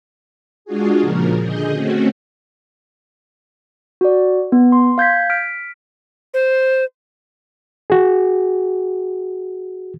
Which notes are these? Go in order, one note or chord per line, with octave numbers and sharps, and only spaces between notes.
G#3 D4 F4 F#4 G#4
A#2 C#3 F3 A#4
D3 G#4 D#5 G6
A3 C4 C#4 F#4
F#4 D5
B3
C6
F5 G6 G#6 B6
F6 B6 D7
C5
F#4 G#4